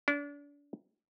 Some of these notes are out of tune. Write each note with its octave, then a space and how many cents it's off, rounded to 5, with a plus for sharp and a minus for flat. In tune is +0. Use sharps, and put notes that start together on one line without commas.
D4 -35